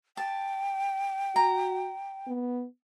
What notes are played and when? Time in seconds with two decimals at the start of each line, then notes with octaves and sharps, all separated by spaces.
0.17 G5 A5
1.36 F#4 A#5
2.27 B3